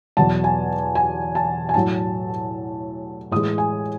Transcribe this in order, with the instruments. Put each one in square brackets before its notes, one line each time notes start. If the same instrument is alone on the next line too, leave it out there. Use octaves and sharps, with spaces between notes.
[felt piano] E2 B2 F#3 A5
G#5
G#5
A5
G#5
A2 F#3 A5
A2 E3 G#3 D#6
G#5